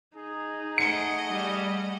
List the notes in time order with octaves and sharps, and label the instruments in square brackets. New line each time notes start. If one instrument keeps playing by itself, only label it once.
[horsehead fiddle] D#4 [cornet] G#4
[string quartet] A3 D#5 F#5 [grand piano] C#7
[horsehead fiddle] G3